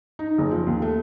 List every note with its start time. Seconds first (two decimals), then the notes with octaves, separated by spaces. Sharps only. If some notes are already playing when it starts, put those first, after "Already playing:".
0.19 D#4
0.38 F#1
0.51 F3
0.67 D#2
0.82 A3